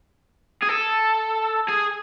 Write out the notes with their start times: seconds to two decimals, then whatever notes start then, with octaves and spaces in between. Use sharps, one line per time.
0.62 G#4
0.69 A4
1.69 G#4